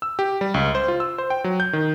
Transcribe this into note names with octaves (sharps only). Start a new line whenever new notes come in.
E6
G4
G3
C#2
C5
F4
E6
C5
G5
F#3
G6
D#3